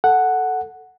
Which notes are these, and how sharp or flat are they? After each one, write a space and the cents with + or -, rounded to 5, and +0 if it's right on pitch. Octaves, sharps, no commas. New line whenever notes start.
A4 +0 F#5 +0